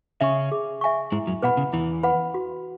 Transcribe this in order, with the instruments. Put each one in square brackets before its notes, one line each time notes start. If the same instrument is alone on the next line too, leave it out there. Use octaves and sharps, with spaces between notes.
[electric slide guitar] C#3 C#4 [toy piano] E5 G#5 C#6
[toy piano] G#4
E5 G#5 C#6
[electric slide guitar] G#2 G#3 [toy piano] E4
[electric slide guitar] F#2 F#3
[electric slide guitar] B2 [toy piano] B4 F#5 B5
[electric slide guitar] C#3
[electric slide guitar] E2 E3 [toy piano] E4
[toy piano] B4 F#5 B5
F#4